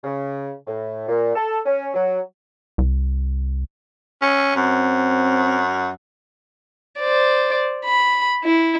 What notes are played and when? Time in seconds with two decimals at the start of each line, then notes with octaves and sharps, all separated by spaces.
0.04 C#3
0.67 A2
1.09 A#2
1.35 A4
1.66 C#4
1.94 F#3
2.78 C2
4.22 C#4
4.56 F#2 C4
6.99 C5 D5
7.85 B5
8.44 E4